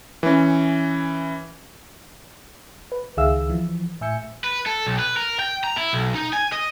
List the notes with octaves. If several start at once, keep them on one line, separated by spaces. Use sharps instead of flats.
E3 C#4
B4
C#2 D#3 G#4 E5 F5 E6
E3 F3
A2 E5 G#5 E6 G6 C#7
B4
A4
B1
B4
A#4
G5
A#5
E4
B1
D#4
G#5
D#5